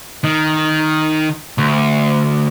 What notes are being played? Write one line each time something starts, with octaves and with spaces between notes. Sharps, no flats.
D#3
D2